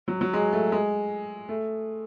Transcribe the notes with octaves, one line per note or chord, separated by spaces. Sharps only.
F#3
F#3
G#3
A3
G#3
A3